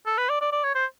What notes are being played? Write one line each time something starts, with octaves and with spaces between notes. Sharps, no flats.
A4
B4
D5
D5
D5
C#5
C5